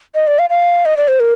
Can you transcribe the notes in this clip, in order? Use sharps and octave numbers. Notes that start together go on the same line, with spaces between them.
D#5
D5
F5
F5
D#5
D5
C5
A#4